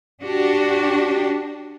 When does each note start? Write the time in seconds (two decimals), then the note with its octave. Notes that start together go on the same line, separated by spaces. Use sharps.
0.22 D4 F#4 G4